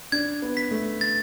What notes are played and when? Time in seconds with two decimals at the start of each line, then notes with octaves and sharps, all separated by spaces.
0.12 D4 G#6
0.42 B3
0.57 B6
0.71 A3
1.01 A6